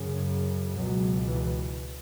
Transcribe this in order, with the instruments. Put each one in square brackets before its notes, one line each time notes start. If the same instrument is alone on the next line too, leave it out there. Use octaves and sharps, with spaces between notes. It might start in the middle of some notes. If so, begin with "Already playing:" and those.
Already playing: [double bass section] F#2 C#3
C#2 B2 F#3
E3